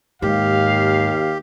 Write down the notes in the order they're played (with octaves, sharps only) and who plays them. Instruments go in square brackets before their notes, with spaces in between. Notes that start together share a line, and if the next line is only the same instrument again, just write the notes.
[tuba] D#2 [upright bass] G#2 [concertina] G4 [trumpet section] F5